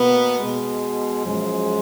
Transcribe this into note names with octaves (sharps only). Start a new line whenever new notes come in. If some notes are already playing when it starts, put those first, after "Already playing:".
Already playing: B2 A#3 B3
B2 G#3
F#2 F3 G#3